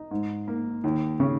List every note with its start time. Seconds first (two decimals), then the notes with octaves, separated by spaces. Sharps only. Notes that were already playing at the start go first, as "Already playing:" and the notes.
Already playing: D#4
0.11 G#2
0.48 A#3
0.84 D#2
1.20 C#3